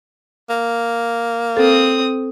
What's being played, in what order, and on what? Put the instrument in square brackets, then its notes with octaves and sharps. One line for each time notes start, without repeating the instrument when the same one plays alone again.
[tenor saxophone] A#3
[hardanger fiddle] C4 D#6 [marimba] A4